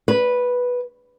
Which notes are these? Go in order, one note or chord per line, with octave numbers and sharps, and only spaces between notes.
B4